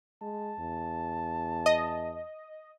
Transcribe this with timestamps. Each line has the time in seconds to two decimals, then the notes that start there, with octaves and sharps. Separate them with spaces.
0.22 G#3 A5
0.60 E2
1.66 D#5